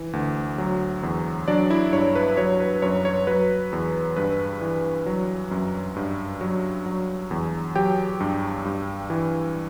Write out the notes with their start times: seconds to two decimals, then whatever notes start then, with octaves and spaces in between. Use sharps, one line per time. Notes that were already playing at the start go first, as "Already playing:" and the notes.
Already playing: E3
0.13 D2
0.58 F#3
1.03 E2
1.48 F#3 D4 D5
1.70 E4 E5
1.93 G2 C#5
2.15 B4
2.37 F#3 C#5
2.60 B4
2.82 F#2 C#5
3.05 C#5
3.27 F#3 B4
3.73 E2
4.16 G2 B4
4.61 E3
5.06 F#3
5.51 F#2
5.96 G2
6.41 F#3
6.86 F#3
7.31 E2
7.76 F#3 G4 G5
8.20 G2
8.65 G2
9.10 E3